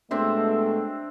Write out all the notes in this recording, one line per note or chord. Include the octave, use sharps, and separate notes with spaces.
B2 G#3 A3 C4 D4 E5